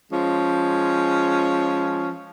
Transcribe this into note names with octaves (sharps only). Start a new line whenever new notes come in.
F3 G#3 C#4